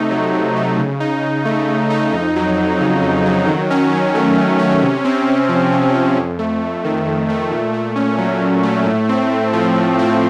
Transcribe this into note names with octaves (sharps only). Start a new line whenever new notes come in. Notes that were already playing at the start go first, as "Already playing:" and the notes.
Already playing: C3 A3 D#4
F#3
C3
A3
C#3
D#4
C#3
A3
C#3
D#4
F2
F#3
F2
C#3
F2
F#3
D#3
C#4
D#3
A3
D#3
C#4
C3
C4
C3
F3
C3
C4
F2
A3
F2
D#3
F2
A3
A#2
A3
C#4
F#3
A#2
A3
A2
C4
A2
F3
A2
C4